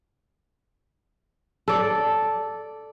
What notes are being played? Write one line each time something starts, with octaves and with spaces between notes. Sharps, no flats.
A4 D5